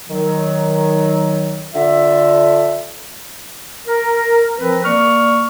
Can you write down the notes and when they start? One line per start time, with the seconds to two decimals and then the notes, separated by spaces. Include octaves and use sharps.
0.09 D#3 F#3
1.74 D3 F4 E5
3.87 A#4
4.58 F3 C4 A#4 B4
4.85 A#3 D5 C#6 F6